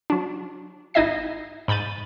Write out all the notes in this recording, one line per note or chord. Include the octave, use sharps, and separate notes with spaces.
F#3 D4
G#1 D#4 E4 D#5 E5 C7
G#2 B5 G6 A6 D#7